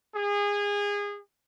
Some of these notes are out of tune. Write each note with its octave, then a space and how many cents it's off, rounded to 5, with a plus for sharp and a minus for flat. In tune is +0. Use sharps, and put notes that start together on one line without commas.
G#4 -25